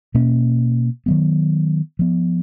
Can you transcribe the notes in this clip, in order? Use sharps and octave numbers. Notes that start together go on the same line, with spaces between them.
B2 A#3 C#4
D#3 F#3 B3
F3 B3